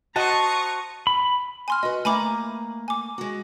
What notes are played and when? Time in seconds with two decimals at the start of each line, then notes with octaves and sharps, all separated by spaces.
0.16 F#4 C5 D#5 A5 A#5 C#6 D#6
1.07 B5
1.68 G#5 C6 F6
1.83 F#4 B4 D#5
2.05 A3 A#3 G#5 A#5 B5 D6
2.88 G#5 D6
3.18 G#3 F#4